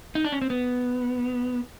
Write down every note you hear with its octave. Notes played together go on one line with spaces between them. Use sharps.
D#4
D4
C#4
C4
B3